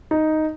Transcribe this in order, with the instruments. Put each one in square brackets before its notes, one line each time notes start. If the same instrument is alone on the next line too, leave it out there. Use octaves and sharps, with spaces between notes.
[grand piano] D#4